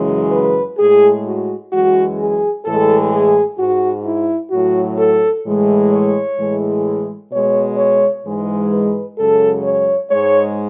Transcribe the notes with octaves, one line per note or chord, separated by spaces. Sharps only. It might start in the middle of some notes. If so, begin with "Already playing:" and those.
Already playing: F#2 C#3 E3 G#3
B4
A2 G#3 G#4
F#4
F#2 E3 G#3 F#4
G#4
A2 E3 G#3 A4
G#4
G#2 G#3 F#4
E4
A2 F#3 F#4
A4
A2 E3 G#3
C#5
A2 E3 G#3
B2 G#3 C#5
C#5
G#2 E3 G#3
B4
F#2 C#3 G#3 A4
C#5
G#2 G#3 C#5